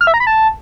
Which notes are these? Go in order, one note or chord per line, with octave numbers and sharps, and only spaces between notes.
F6
E5
A#5
B5
A5